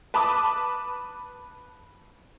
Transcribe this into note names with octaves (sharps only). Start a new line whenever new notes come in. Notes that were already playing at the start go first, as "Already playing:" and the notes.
B4 A5 B5 D6 D#6